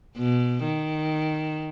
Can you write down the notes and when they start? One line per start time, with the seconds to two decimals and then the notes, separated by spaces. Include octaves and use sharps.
0.18 B2
0.65 D#3